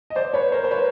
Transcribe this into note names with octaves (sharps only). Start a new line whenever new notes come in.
D#5
C5 D5
B4 C#5
A#4 C5
C5
B4 C#5